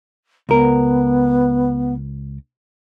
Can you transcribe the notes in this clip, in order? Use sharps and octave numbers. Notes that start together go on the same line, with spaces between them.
C#2 B3 A#4